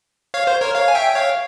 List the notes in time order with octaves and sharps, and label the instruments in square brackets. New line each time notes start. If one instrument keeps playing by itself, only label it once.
[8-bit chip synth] C#5 F5
C5
A#4 C#5
C#5 F5
G#5
E5 G5
G5
C#5 F5